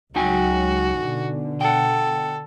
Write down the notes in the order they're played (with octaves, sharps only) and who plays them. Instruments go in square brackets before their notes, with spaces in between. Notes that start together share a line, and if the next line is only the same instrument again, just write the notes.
[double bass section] C#2 F#3 [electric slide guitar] D#4 G5 G#5 [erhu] F#4
[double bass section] B2 D3
[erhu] A4 [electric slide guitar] F#5 G5